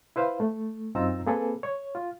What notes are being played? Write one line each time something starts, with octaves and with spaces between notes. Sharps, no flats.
E4 B4 C5 F5
A3
F#2 C4 D#4 F4 A#5 E6
A#3 C4 G#4 A4 B4
C#5
F4